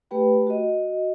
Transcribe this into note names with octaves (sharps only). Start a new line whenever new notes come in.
A3 G4 B4 G5 B5
F#4 D#5